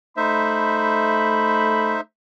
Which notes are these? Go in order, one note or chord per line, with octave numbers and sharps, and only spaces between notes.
A3 D#4 C5 E5 B5